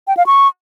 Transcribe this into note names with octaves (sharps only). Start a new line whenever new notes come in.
G5
F5
C#6